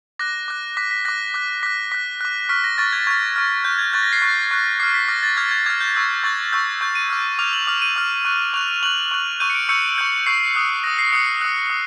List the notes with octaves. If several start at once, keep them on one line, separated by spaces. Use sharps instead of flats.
D6 F#6 A#6
D6 F#6
D6 F#6 B6
B6
D6 F#6 A#6
D6 F#6
D6 F#6 B6
D6 F#6 B6
D6 F#6
C#6 F6 B6
A#6
C#6 F6 A6
G#6
C#6 F6 G#6
C#6 F6
C#6 F#6 G6
G#6
C#6 F#6 A6
A#6
C7
C#6 F#6
C#6 F#6
D6 F6 C7
B6
D6 F6 A#6
A6
D6 F6 G#6
G#6
D6 F6 G#6
G6
C#6 E6 G6
C#6 E6 G6 A6
C#6 E6 G6
C#6 E6 G6
D#7
D6 F6
D6 F6 F7
F#7
D6 F6 F7
D#7
D6 F6
C#6 F#6
C#6 F#6 F7
C#6 F#6 F#7
C#6 F#6
C#6 E6 G6 D#7
C#7
D7
C#6 E6 G6 C#7
C#6 E6 G6
C#6 E6 G6 C7
D#6 F#6
D#6 F#6 A#6
C7
D#6 F#6 C#7
D#6 F#6
D#6